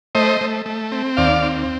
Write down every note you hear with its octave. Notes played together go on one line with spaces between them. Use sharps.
A3 C5 D#5
A3
A3
C4
D#2 D5 F5
C4